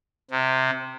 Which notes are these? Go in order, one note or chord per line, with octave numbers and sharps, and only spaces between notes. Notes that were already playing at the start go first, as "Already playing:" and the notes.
C3